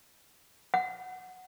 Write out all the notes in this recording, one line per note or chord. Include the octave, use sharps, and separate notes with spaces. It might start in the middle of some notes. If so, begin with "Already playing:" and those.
F#5